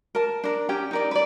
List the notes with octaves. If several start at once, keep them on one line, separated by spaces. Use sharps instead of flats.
A#4 A5
D4 A#4
C#4 G4 G5
D#4 A#4 D5
B4 D5